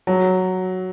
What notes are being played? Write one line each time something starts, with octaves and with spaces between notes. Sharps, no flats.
F#3